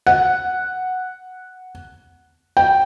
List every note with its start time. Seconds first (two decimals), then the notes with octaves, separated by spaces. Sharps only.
0.07 F#5
2.57 G5